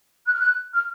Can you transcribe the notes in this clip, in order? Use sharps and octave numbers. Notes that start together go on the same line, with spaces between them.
F#6
F6
F#6
F6